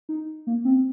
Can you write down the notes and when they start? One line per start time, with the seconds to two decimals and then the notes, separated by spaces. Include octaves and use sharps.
0.09 D#4
0.47 A#3
0.65 C4